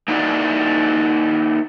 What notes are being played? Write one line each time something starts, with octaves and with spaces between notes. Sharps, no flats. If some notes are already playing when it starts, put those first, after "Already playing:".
A#3 D#4 E4 F#4 D5